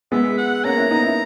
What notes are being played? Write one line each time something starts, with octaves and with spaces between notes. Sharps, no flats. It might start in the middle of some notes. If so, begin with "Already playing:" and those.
G#3 B3 E5
F#5
A#3 C#4 A#5
C#4 E4
B3 D#4
C#4 E4